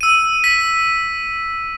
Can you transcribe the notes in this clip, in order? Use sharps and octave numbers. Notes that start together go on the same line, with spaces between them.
E6 D#7
B6